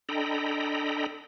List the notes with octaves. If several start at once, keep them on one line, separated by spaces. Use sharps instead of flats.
D4 A4 D#5 G5 A#5 B5